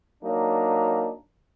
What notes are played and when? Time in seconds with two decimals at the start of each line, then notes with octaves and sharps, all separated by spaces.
0.23 F#3 A#3 D4 D#4